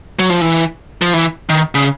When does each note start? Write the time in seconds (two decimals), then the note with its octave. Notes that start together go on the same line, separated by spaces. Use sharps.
0.19 F#3
0.30 F3
0.41 E3
1.02 F3
1.13 E3
1.50 D#3
1.75 C#3